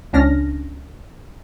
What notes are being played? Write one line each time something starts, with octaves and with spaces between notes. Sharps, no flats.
C#2 C#4 D4 F6 A#6